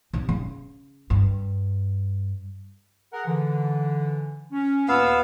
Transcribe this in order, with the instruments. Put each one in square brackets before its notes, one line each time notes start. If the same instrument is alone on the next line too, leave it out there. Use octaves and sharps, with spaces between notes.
[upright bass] C3 D#4
C#3
G2
[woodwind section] G#4 A#4 F#5
D3 E3
C#4
[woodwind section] D#2 A#2 E6 [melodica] B3 F5